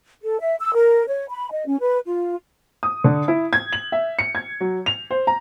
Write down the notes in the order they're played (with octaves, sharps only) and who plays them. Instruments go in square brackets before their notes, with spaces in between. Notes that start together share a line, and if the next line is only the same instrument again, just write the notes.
[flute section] A4
E5
E6
A#4
C#5
B5
D#5
C#4
B4
F4
[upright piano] D#6
D3
E4
G#6
F#7
E5
C#7
G#6
F#3
F7
C5
A#5